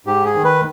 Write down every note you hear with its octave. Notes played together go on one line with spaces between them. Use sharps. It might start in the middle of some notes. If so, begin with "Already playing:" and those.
G#2 G4
G#4
D#3
B4